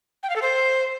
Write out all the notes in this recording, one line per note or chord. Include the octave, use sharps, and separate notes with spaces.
G5
F5
A4
C5